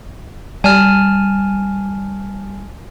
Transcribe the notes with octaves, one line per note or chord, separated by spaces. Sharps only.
G3 G#5 A5 F6